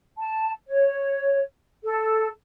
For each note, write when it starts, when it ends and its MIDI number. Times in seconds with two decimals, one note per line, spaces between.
0.17 0.51 81
0.66 1.41 73
1.84 2.27 69